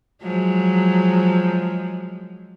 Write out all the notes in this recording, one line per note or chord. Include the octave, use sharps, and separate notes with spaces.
F3 F#3 G#3